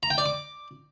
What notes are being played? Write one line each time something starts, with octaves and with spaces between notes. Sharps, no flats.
A#5
G5
D5
D6